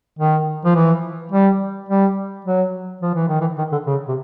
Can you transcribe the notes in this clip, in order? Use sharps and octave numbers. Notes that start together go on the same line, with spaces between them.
D#3
F3
E3
G3
G3
F#3
F3
E3
D#3
E3
D#3
D3
C#3
C3